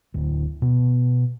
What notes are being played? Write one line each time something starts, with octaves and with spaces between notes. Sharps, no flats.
D1
B2 B3